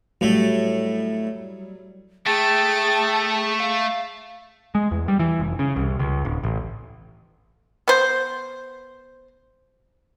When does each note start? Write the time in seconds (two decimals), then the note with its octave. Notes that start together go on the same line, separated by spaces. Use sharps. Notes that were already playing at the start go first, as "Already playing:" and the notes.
0.21 A2 F#3 G3 A3
2.26 A3 G#4 G5 A5
3.60 F5
4.75 G#3
4.91 E2
5.08 G3
5.19 E3
5.40 F1
5.59 C#3
5.76 C2
6.00 C#2
6.25 D1
6.44 A1
7.88 B3 C5